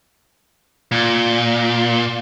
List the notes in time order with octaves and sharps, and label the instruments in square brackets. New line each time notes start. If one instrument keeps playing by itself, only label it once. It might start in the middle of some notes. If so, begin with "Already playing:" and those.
[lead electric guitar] A#2